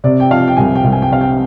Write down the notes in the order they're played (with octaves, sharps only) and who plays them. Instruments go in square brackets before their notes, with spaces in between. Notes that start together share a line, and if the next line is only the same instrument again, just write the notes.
[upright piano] C3 D5
G5
F3 F5
G5
C2 G#5
G5
C2
G#5
G5
C3 F5
G5